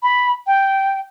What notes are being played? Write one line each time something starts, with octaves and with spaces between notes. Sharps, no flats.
B5
G5